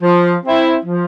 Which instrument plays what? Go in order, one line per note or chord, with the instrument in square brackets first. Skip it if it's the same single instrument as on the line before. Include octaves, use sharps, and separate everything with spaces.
[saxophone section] F3
C4 E4
F3